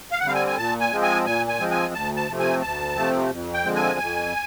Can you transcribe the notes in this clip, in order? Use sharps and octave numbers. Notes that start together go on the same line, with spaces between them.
F5
F#5
D3 G3 C4 F5
G#5
G#5
A#2 A5
G#5
F3 G#3 C4
G#5
A#2 G#5
G#5
F3 G#3 C4
G#5
D2 A5
A5
C3 F3 A3 C4
G#5
D2 A5
C3 F3 A3 C4
F2
G5
D3 F3 G#3 C4
G#5
F2